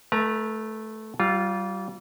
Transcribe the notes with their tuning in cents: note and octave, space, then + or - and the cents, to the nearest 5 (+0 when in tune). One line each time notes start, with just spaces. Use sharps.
A3 -10 B4 -45 A#5 -10
G3 -30 F4 +0